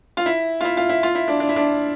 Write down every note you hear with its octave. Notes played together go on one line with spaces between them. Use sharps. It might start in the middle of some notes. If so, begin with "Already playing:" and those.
F4
E4
F4
E4
F4
E4
F4
E4
D4
D4
E4
D4